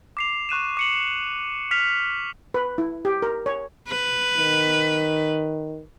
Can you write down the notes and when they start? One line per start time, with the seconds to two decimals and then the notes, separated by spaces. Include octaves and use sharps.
0.17 D6 C7 F7
0.49 C#6 F#6 D#7 E7
0.77 D6 C#7 F#7
1.71 F6 B6 F7
2.54 B4
2.78 E4
3.05 G4
3.22 A#4
3.46 C#5
3.88 B4
4.38 D#3